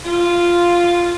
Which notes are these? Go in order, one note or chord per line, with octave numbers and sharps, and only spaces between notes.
F4